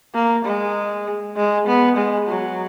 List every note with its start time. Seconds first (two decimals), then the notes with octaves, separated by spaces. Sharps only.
0.15 A#3
0.45 G#3
1.36 G#3
1.67 B3
1.97 G#3
2.28 F#3